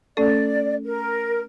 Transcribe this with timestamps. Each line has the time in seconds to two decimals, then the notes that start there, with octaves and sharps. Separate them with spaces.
0.17 A3 C#4 A4 D5
0.84 A#4